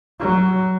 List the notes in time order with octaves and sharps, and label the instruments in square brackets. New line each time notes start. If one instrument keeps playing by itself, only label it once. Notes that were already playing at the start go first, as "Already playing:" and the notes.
[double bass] F#3